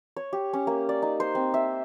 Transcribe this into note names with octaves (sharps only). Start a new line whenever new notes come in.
C#5
G4
C#4
A#3
D5
D#4
C5
C4
E5